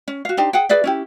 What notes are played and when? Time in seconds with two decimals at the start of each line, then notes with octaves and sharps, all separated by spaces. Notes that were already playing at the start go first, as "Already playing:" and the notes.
0.08 C#4
0.25 F#4 F5
0.37 D4 D#4 G4 C5
0.53 G#4 F#5 G5
0.69 G#4 B4 D5 E5
0.84 C#4 E4 G4